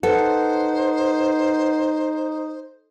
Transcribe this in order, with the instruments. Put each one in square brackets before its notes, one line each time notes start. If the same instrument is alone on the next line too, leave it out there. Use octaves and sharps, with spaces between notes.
[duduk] D#4 [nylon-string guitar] A4 [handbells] B4 F#5 [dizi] C5